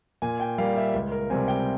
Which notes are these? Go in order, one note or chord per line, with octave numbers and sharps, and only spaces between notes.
A#2 G#5
G5
G3 A#3 F5
E5
C#2
A#4
C3 G3 C4 G#5
G5